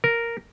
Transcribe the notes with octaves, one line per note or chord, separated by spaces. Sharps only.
A#4